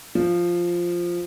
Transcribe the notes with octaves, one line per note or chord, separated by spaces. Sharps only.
F3